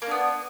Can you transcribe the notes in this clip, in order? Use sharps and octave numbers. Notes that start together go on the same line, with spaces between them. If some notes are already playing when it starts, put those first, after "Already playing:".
A#3 B3 D4